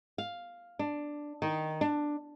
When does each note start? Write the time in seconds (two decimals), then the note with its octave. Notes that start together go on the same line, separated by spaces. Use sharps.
0.18 F5
0.79 D4
1.42 D#3
1.81 D4